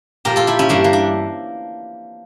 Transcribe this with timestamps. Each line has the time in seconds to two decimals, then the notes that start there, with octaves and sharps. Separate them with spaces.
0.25 A#2 F3 G4 A#4
0.36 F4 A4
0.47 E4 G4
0.59 C#4 E4
0.69 G2 E3 G3 A#3 D4
0.84 A#3
0.93 D4